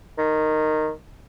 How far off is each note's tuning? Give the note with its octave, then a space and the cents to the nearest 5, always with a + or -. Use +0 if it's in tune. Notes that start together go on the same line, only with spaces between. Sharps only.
D#3 -10